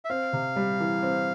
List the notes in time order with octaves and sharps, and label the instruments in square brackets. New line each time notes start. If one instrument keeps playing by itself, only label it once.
[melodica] E5
[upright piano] C4 [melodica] F5
[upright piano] C3
G3
E3
C4